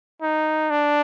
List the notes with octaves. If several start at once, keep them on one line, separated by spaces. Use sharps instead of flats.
D#4
D4